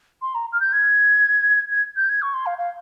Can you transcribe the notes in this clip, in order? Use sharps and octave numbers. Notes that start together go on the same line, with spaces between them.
C6
A#5
F6
G6
G#6
G#6
G6
G#6
C#6
C6
F5
F5